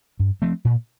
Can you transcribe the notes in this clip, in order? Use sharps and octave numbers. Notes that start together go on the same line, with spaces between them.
G2
F3 A3 C4
A#2